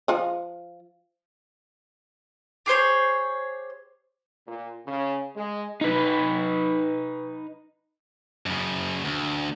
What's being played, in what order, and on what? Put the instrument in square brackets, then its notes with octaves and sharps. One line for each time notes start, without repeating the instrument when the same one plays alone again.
[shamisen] F3 F4 D#5
[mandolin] G4 G#4 C5 C#5
[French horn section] A#2
C#3
G#3
[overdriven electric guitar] D#4 B4
[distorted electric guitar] F#2 C#3
D2